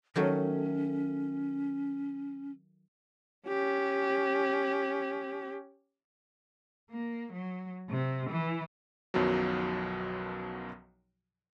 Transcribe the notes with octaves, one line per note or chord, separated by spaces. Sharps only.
D#3 F#3 A3 C#4
C#4 G4
A#3
F#3
C3
E3
B1 F#2 B2 D#3 F3 F#3